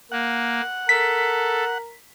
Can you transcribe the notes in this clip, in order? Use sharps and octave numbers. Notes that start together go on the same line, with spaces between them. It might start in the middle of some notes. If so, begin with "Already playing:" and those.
A#3 F#5
A4 A#4 B6